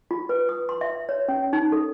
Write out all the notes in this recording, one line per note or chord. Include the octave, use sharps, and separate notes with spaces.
F4
B4
D#6
C6
E5
C#5
C#4
D#4
A4